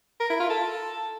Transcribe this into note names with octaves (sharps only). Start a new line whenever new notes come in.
A#4
E4
F4
A4